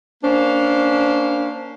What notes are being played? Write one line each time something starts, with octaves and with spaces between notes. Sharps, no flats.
A#3 C#4 D4 C5